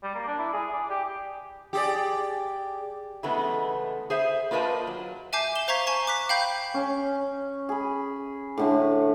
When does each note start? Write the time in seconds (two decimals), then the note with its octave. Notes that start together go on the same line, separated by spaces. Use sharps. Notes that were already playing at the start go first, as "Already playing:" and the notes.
0.03 G3
0.15 A#3
0.27 D4
0.39 E4
0.53 G#4
0.73 D5
0.90 G4
1.73 G4 G#4 D5
3.23 C#3 E3 G#3 A3 B3
4.10 G#4 C5 E5
4.51 A#3 F4 A#4 B4 D#5 A5
4.87 F#3
5.33 E5 G#5 A5 D6 G6 C7
5.55 E7 G7
5.68 C5 F5 A#5 C#6 G#6 B6
5.87 G#5 A5 C#6 G#6
6.07 D6 F#6 B6
6.29 F5 G5 B5 G6
6.74 C#4
7.69 G#4 B5
8.58 A2 D3 A3